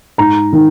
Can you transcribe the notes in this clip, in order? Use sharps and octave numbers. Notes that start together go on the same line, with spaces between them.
G#2 A#5
D#3